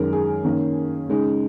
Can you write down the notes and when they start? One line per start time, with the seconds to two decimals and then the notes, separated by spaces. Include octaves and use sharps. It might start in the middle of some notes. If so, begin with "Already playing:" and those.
Already playing: F#2 D#3 G#3 A#4
0.13 G#4
0.44 D#3 A#3 C#4
1.09 C#3 G#3 D#4